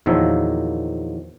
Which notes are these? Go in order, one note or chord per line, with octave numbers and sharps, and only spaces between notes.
E2 A#2 D#3 F3 F#3 E5